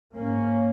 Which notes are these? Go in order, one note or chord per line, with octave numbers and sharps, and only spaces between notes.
G#2 A#3 C#4